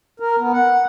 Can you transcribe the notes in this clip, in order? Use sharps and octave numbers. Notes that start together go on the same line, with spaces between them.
A#4
B3
F#5